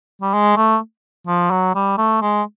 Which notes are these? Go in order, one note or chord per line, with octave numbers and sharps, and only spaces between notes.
G3
G#3
A3
F3
F#3
G3
A3
G#3